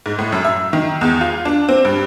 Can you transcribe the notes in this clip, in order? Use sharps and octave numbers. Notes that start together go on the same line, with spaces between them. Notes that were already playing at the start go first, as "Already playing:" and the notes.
G#2
A2
F#2
E5
D#3
E2
F4
D4
C4
G2